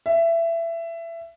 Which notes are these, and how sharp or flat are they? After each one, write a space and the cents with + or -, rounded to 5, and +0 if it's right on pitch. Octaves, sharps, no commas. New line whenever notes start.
E5 +20